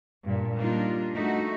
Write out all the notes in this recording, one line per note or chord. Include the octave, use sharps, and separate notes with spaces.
G2 A#2
G3 A#3 D4 D#4 F4
A3 D#4 F#4 E5